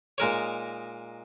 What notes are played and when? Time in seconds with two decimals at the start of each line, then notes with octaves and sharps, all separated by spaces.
0.18 A#2 G#3 D#4 A#4 C#5